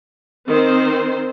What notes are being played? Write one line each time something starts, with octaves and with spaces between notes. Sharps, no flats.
D#3 C4 C5